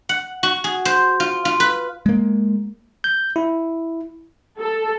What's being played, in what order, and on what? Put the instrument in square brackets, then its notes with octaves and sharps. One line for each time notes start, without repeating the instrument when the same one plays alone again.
[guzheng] F#5
F#4
G#4
C5
F4
F4
B4
[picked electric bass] G#3 A#3
[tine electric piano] G6
E4
[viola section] A4